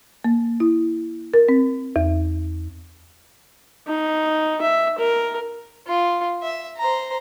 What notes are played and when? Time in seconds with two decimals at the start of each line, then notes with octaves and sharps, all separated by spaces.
0.24 A#3
0.60 E4
1.34 A#4
1.49 C4
1.96 E2
3.87 D#4
4.62 E5
4.98 A#4
5.87 F4
6.43 E5
6.78 C5 A#5